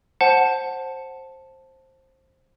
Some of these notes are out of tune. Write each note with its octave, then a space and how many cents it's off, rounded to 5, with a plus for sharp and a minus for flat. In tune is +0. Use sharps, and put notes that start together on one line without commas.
C5 +15 F#5 +5 A5 +0